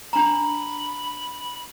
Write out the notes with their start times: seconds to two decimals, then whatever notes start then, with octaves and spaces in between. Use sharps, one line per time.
0.13 D4 A#5 B5